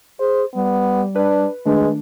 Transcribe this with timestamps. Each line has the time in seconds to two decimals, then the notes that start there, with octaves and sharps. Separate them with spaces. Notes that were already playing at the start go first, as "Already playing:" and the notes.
0.20 G#4 C5
0.55 G3 B3
1.16 D4 B4
1.66 D#3 G#3 A3 D4 B4